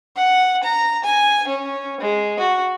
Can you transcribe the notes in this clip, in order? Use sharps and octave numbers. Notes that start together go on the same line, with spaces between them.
F#5
A#5
G#5
C#4
G#3
F#4